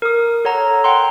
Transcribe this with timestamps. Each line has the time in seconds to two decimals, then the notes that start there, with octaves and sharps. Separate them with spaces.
0.02 A#4 D#6
0.45 A4 C#5 F#5 A#5
0.84 F#5 G5 A#5 C6